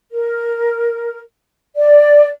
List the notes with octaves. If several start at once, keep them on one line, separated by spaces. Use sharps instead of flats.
A#4
D5